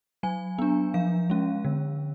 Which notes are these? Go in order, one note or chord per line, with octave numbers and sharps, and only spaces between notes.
F#3 G#5
B3 D4
F3 F5
G#3 C#4
D3